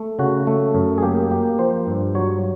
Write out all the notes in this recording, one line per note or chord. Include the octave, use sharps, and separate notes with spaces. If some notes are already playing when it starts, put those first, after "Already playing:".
Already playing: A3
C#3 F#4
A3
F#2
G#4
A#3 G4
A#3 G4
F3 C5
G2
F#3 C#5